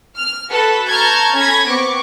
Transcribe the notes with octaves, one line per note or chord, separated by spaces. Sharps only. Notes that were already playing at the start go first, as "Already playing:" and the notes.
F6
F#4 A4 B4
A5 A#5 C#6 F6 G6 G#6
C#4 A4 B5 G#6 A#6 B6
B3 C4 C#6 D6